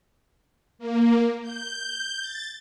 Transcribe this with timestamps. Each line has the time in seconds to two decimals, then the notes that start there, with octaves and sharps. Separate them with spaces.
0.79 A#3
1.42 G6
2.21 A6